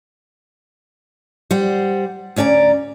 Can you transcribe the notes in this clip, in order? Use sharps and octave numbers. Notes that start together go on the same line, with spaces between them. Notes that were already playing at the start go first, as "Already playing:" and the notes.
G3 C5 F#5
D2 C#4 D5 G#5 A#5